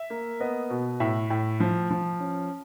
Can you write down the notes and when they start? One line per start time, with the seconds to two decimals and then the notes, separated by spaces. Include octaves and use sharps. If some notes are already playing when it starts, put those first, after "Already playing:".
Already playing: E5
0.10 A#3
0.40 B3 D#5
0.70 B2
1.00 A2 E5
1.30 A2
1.60 F3
1.90 F3
2.20 C#4